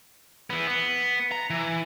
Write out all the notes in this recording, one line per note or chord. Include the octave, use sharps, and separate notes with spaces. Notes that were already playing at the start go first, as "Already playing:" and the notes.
E3 B3
B3
A#5
E3